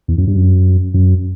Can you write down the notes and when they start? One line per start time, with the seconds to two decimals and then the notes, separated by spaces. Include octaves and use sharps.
0.08 E2
0.18 F#2
0.27 G2
0.37 F#2
0.94 F#2